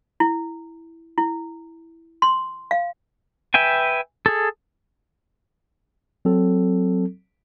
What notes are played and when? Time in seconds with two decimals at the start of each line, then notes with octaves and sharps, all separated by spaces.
0.20 E4
1.18 E4
2.22 C6
2.71 F5
3.54 B4 E5 G5 G#5
4.26 G#4 A4
6.25 F#3 C4 A4